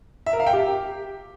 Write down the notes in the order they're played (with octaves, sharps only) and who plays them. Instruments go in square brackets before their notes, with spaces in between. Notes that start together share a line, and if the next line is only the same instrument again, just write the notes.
[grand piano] E5
A#4
F5
G5
G4